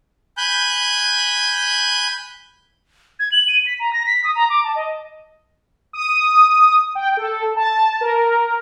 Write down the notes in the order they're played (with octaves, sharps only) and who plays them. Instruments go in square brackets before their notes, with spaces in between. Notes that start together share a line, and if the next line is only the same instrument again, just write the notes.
[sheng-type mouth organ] G#5 B5 F#6 G6
[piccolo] G#6
F#7
D#7
B6
A#5
A#6
B6
D#6
A#5
D6
A5
D#5
[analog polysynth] D#6
G5
A4
A5
A#4